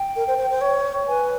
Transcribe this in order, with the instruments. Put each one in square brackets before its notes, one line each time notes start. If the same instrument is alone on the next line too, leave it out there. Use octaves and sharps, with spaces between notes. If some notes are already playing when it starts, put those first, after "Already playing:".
Already playing: [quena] G5
[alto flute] A#4
C5
C5
C5
C#5
[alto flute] B4 [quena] G#5